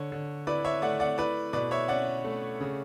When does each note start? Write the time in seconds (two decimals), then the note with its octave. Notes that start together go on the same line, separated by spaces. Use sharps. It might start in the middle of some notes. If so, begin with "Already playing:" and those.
Already playing: D3 C#5
0.12 D3
0.47 E4 B4 D5
0.65 C#5 E5
0.82 A3 D5 F#5
1.00 D5 F#5
1.18 E4 B4 D5
1.53 B2 B4 D5
1.71 C#5 E5
1.88 C#4 D5 F#5
2.24 A3
2.60 C#3